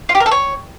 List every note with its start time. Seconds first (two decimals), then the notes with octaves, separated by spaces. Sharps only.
0.09 F4
0.15 G4
0.20 A#4
0.26 A4
0.31 C#5